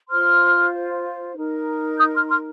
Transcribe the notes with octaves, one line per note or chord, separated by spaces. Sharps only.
F4 C5 C6 F6
D#4 A#4
D#6 G6
C6 F6
C6 F6